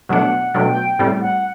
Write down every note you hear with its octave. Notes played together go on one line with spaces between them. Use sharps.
B2 F#3 A3 D4 F#5
B2 F#3 A3 D4 G5
A2 G3 C4
F#5